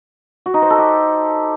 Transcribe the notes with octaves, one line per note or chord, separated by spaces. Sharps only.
F#4
D#4
C5
A4
G4